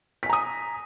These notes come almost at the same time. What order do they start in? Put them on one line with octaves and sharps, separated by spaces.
B6 G#5 A#5 D#6